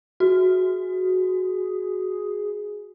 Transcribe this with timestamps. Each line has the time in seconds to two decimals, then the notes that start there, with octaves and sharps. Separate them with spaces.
0.20 F#4 G#4